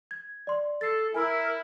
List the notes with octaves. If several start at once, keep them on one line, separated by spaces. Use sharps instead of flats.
G#6
D5 C6
A4 A6 C7
E4 A#4 G#5 E6